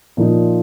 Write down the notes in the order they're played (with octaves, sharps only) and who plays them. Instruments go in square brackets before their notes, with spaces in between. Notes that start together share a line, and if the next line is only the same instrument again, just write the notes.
[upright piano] A#2 F3 A#3 D#4